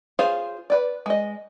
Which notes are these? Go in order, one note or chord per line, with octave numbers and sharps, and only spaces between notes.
F4 G#4 C5 C#5 F5
B4 D5
G#3 D#5